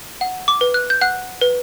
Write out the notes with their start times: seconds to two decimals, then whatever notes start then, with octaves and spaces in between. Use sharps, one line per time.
0.21 F#5
0.48 D6
0.61 B4
0.74 F#6
0.90 G6
1.01 F#5 F#6
1.41 B4